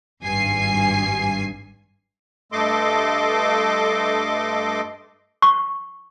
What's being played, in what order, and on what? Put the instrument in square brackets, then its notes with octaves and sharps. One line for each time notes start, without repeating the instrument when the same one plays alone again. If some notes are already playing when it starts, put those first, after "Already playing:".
[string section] G#1 G2 G#5 C7
[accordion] G2 A3 A4 D#5 C6 D6
[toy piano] C#6